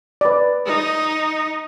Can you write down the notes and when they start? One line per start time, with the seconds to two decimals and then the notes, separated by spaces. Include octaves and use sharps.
0.21 B4 D5
0.66 D#4